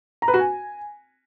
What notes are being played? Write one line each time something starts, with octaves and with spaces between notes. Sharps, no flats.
A#5
B4
F#4
G#5